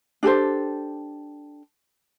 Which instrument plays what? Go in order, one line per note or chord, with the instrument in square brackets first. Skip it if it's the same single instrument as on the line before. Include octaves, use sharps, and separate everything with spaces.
[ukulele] D4 G4 A4 C5